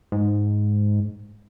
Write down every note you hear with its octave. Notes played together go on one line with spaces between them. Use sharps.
G#2